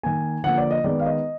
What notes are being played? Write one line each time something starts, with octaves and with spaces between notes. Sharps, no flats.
D#3 A#3 G#5
D3 F3 A#3 F#5
D5
D#5
D#3 G#3 B3 D5
F5
D#5